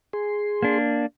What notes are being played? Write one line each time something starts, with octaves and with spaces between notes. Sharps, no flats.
G#4 C6
A#3 D4